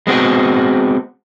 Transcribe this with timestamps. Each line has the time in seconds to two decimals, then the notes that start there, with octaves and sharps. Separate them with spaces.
0.07 G#3 B3 C4 F#4